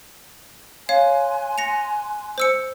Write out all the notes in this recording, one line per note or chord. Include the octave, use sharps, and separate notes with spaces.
C#5 F5 G#5 C6 F#6
A#6 C#7 F7
C5 E6 C#7